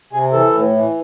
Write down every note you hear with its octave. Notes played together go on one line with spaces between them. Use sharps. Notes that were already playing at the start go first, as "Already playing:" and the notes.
C3 G#4
E3 A4
A2
E3